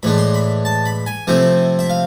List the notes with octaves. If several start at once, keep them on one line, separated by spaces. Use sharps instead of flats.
A2 E3 G#3 D4 B5
C6
B5
A5
B5
G#5
C3 F3 A3 C4 E4
E5
F5